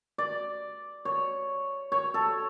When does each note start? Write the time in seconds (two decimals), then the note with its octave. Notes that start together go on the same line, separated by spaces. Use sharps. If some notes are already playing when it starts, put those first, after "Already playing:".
0.18 D5
1.05 C#5
1.92 C#5
2.14 A4